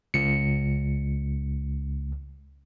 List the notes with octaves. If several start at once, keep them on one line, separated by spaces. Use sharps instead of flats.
C#2 C#7